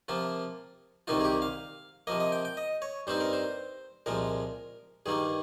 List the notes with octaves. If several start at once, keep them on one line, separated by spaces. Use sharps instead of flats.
C3 F3 A#3 F4
C2 C3 D#3 A#3 D#4 F4
G#4
G4
F5
C3 F3 A#3 D#5
D#5
G5
G5
D#5
C#5
G2 G3 C4 D#4 C5
A#4
C5
C2 A#2 F3 G#3 A#4
G2 D#3 G3 A#3 G#4